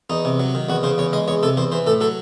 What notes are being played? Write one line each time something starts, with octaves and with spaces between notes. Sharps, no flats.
E2 D#4
C3
F#3
D#3
E2 F#4
C#3 C5
E2 C#5
G#3 D#5
E2 C#5
C3 A4
E2 C5
E3 C5
A2 A4
F#3 A4